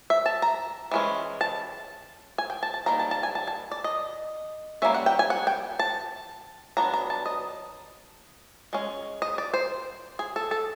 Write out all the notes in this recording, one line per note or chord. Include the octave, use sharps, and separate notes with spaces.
E5
A5
A#5
E3 G#3 C#4
A5
G#5
G5
A5
A5
D#3 G3 A#3 A#5
A5
A5
G#5
A5
A5
D5
D#5
G3 A#3 C#4 E5
F#5
G5
G#5
F#5
G5
A5
F#3 B3 D4 A#5
A#5
A5
D#5
G#3 C#4
D#5
D5
C5
G#4
A4
A4